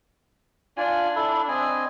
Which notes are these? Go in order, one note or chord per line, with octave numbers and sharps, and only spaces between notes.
D4 F4 G#5
E4 A4
C4 D#5 G#5